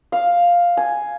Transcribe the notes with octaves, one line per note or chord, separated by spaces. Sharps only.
F5
G#5